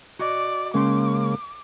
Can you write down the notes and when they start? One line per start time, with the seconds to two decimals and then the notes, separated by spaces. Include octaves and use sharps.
0.19 F#4 D5 D#5
0.74 C#3 G#3 A#3 C#4 C6 D6